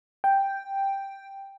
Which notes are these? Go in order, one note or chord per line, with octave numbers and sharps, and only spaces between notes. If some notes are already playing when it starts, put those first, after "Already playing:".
G5